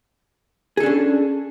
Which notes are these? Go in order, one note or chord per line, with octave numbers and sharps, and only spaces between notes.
C#4 D4 G#4 A4